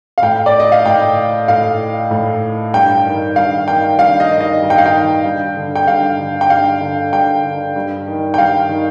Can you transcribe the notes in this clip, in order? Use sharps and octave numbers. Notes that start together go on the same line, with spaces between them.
F5
A2 G5
D5
D#5
F5
A2 G5
A2 F5
A2
G2 G5
D#3
G2 F5
D#3 G5
G2 F5
D#5
D#3
D#5
G2
G5
F5
G5
D#3
G2
D3
G5
G2 F5
D3
G5
G2 F5
D3
G2 G5
D3
G2
D#3
G5
G2 F5
D#3